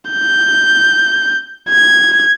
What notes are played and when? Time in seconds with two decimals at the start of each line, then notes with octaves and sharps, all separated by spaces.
0.11 G6
1.70 G#6